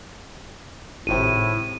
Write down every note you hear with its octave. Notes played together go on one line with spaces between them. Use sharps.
G#1 A2 C3 D#7